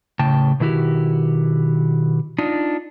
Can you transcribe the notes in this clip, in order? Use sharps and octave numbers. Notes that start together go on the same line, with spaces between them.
A2 C#3 G5 A5
B2 D#3 E4 F#4 G4
D4 D#4 F4